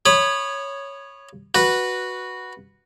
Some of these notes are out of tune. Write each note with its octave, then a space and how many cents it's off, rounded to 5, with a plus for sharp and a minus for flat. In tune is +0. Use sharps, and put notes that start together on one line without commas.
C#5 +0 B5 +0 D#6 -30
F#4 +0 B4 -10